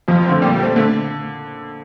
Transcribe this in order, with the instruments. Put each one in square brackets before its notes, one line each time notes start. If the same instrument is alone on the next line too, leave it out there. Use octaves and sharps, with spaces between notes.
[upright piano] F2 [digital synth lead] F3
[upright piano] D3 A3 C4
[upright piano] A#2 [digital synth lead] G3
[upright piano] A3 C4
[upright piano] D3 [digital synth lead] A3